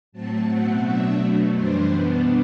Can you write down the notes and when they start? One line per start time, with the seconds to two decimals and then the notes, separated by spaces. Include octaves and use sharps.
0.12 A2 F#3 A3 C4 A5
0.47 B2 A3 C4 F#5
0.82 B2 F#3 A3 D4 E5
1.17 B2 F#3 A3
1.52 F#2 E3 G3 D4 C5
1.88 B2 G3 B3 D4